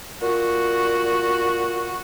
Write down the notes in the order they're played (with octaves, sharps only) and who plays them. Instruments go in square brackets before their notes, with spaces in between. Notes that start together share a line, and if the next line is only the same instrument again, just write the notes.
[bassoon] A#2 [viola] F#4